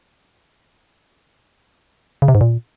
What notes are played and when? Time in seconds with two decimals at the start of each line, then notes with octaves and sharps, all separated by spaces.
2.22 C#3
2.28 C3
2.35 G#2
2.41 A#2